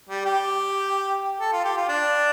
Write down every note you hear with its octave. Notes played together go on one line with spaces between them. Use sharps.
G3
G4
A4
F4
G4
F4
D4